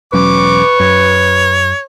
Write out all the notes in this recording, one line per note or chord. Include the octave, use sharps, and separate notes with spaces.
E1 F#3 C#4 B4 C#6 D6
F#2 C#5